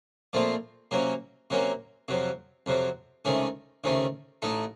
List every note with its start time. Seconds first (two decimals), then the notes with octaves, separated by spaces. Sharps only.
0.33 A#2 F3 A3 C4 F4
0.91 C3 F#3 A#3 C#4
1.50 C3 F#3 A#3 C#4
2.08 F2 C3 F#3
2.66 F2 C3 F#3
3.25 C#2 C3 D#3 A3 C#4
3.84 C#2 C3 D#3 A3 C#4
4.42 A1 A2 A3 D#4 A4